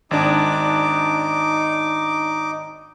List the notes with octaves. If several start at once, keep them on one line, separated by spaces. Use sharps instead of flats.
G#1 D4 D#4 D6